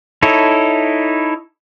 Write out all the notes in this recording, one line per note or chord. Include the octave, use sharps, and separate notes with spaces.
D#4 E4 A4 C#5